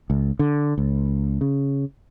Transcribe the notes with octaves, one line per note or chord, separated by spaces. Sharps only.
C#2
D3
C#2
C#3